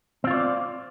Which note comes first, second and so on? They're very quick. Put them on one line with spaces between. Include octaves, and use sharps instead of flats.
C4 F4 C#5 D5